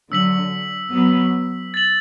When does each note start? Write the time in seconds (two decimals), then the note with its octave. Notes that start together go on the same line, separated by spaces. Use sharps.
0.11 D3 F#3 E6 B6 F#7
0.92 F#3 B3
1.74 A6 F#7